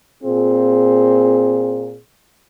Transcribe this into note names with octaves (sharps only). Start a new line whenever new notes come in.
A#2 C4 F4 G#4